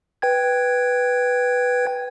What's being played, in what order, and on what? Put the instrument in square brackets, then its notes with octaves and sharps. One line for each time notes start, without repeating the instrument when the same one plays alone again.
[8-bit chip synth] B4 G5 G#6